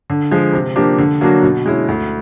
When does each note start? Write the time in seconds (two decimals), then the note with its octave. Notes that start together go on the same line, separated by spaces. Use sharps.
0.10 D3
0.31 F3 G#3
0.53 C3
0.75 F3 A#3 D4 G4
0.98 D3
1.21 F#3 A#3 D4 F#4
1.43 B2
1.66 G#3 C#4 E4
1.88 D2